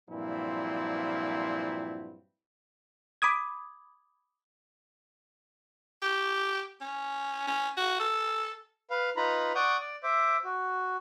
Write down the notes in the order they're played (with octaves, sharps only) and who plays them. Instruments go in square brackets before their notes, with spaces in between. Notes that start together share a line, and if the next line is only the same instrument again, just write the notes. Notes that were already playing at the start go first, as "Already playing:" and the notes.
[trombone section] G2 A#2 F3 F#3 C4 E4
[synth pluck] B5 D6 D#6 G#6
[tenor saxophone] G4
C#4
C#4
F#4
A4
[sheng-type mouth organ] B4 F5
D#4 F4 B4 A#5 B5
D5 F#5 C#6 D#6 G6
D5
C5 E5 D6
F#4